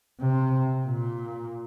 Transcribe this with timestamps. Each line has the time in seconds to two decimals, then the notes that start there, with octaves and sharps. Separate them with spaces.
0.21 C3
0.86 A#2